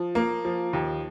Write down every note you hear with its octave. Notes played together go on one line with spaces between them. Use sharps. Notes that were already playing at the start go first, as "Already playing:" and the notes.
Already playing: F3
A#3
F3
D#2